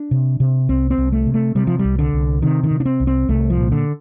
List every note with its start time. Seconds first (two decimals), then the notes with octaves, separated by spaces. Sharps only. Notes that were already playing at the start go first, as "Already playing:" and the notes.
Already playing: D4
0.11 C3
0.40 C3
0.69 C2 C4
0.91 C4
0.98 C2
1.12 A3
1.27 C3
1.34 A3
1.55 C3 G3
1.67 F3
1.79 C2 G3
1.99 D3
2.13 C2
2.42 C3 D#3
2.63 D#3
2.71 C3
2.80 D4
2.85 C4
3.00 C2
3.07 C4
3.29 C2 A3
3.50 F3
3.58 A#2
3.72 D3